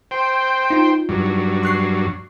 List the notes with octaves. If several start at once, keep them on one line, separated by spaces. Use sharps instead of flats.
C5 G5
D#4 F4
G2 F#3
C#6 F#6 C7